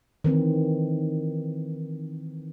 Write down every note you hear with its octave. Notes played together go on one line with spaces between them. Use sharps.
D#3 E3 C4